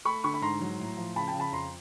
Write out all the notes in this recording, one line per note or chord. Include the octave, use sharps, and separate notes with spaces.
A3 B5 C#6
D3 B5 C#6
B5
G#2 A#5 C6
F#3
A2
F3
C#3 A5 B5
G5 A5
C#3
A5 B5
F2 A#5 C6